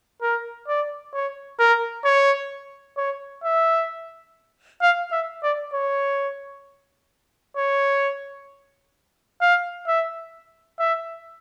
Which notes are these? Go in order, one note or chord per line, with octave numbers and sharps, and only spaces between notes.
A#4
D5
C#5
A#4
C#5
C#5
E5
F5
E5
D5
C#5
C#5
F5
E5
E5